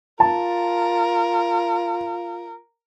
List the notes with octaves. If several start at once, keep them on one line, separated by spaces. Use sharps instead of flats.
F4 A#4 A5